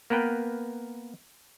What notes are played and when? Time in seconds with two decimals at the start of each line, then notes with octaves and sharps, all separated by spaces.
0.10 A#3 B3 A#4 B4 G5